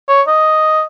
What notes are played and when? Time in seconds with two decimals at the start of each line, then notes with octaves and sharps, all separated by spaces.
0.08 C#5
0.28 D#5